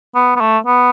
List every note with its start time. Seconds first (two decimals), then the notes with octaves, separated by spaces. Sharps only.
0.15 B3
0.36 B3
0.41 A3
0.66 B3